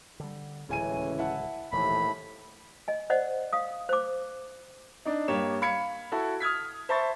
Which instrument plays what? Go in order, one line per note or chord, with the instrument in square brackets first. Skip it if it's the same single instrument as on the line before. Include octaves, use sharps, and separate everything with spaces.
[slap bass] D3 G3
[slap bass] D1 C#2 [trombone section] A2 E3 C#4 [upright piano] C#3 G#5 D#7
[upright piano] E4 F#5 A5
[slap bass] D#1 E3 F3 [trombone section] D#2 A2 C3 [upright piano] A3 [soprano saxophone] B5
[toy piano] D#5 G#5
C5 D5 D#5 F#5
F5 D#6
C5 D6
[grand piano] D4 D#4
G2 A#3 G4 C#5 E7
F5 B5 G#6 C#7
E4 F#4 A4
D#6 F6 G#6 B6
C5 E5 A5 B5 C#6 A6